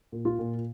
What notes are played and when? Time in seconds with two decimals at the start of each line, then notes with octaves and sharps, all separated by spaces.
0.12 A#2
0.25 F4
0.39 A#2